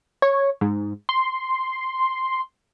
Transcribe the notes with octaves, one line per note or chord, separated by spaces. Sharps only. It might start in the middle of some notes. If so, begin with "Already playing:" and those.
C#5
G#2
C6